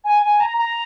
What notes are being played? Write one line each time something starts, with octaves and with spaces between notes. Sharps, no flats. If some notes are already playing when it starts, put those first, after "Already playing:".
G#5
G#5
A#5
A#5